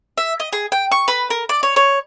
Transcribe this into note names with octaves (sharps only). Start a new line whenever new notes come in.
E5
D#5
G#4
G5
C#6
B4
A#4
D5
C#5
C#5